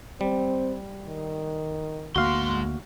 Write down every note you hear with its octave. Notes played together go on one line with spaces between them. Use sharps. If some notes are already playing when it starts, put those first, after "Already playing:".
G3 C4
D#3
D2 G#2 G#3 A#3 F#4 F5 C6